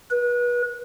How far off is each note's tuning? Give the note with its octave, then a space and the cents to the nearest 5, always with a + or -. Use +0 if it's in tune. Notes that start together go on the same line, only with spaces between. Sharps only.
B4 -30